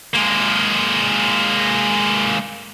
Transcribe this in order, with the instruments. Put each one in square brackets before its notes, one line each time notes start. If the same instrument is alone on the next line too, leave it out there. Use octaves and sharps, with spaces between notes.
[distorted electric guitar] G#3 A#3